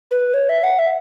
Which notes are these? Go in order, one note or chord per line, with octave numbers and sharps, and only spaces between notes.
B4
C#5
E5
F#5
E5